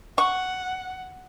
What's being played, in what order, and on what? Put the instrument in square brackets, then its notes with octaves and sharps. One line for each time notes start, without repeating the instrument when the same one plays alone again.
[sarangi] F#5 [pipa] C#6